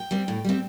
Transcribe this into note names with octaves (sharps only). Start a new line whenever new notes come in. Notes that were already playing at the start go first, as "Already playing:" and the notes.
Already playing: G5
G3 C4
A2
G3 C4